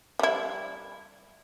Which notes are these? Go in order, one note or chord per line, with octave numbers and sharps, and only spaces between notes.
G3 E4